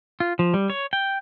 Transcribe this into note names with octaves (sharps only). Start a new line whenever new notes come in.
F4
F3
G3
C#5
G5